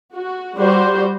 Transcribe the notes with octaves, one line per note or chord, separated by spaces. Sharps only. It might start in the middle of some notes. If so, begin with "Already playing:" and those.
F#4
G3 F#4 C5